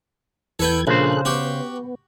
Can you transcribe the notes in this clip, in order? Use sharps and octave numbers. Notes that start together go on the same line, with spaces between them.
E2 E3 A4 B4 G5 G#6
A#1 C#3 G#4 A4 C5 F#6
B3 F#4 G4